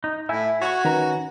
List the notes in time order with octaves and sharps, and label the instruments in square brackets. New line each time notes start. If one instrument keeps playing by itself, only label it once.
[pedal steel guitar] D#4
[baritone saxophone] A2 [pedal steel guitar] E4 [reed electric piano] E5 G#5
[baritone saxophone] F#4 [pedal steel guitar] C#5 C#6
[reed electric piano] D#3 B4 A#5 [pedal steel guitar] C#4